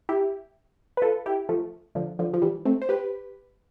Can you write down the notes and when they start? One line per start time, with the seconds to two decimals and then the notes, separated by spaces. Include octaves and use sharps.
0.09 E4 G4
0.97 B4
1.02 F4 A4
1.26 E4 G4
1.49 F3 A3
1.95 D3 F3
2.19 D3 F3
2.34 F3
2.42 E3 G3
2.65 A3 C4
2.82 C5
2.89 G4 B4